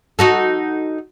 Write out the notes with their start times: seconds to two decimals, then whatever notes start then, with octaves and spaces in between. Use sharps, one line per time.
0.19 D#4 F#4 A4